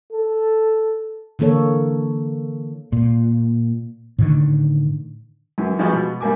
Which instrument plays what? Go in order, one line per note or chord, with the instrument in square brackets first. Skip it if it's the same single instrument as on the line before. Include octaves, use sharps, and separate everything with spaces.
[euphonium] A4
[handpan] D3 E3 A#3 A4 C#5
[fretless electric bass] A#2
A2 D3 D#3
[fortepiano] F#2 E3
E3 F3 G3 G#3 B3 F#4
B2
G2 G3 A#3 G#5 D6